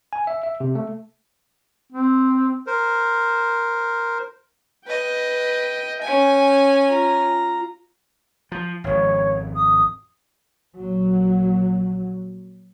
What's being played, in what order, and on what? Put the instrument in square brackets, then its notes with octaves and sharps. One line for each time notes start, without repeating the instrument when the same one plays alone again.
[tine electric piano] G#5
E5
E5
C3
A3
[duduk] C4
[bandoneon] A#4 C5
[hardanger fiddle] B4 D#5 [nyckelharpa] G5
[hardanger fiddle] C#4 G#5
[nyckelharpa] F4 A#5
[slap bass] F3
[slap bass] G#1 F2 [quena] C#5
[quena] D#6
[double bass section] A#1 A#2 F#3